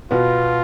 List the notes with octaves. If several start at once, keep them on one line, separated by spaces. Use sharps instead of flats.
B2 B3 F4